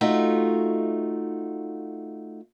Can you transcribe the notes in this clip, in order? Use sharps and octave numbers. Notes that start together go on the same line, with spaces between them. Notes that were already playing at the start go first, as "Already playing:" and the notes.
A3 D#4 F4 F#4